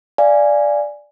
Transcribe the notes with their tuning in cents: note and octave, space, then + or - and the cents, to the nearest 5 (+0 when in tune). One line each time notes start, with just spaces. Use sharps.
D5 +0 F5 -25 G#5 +0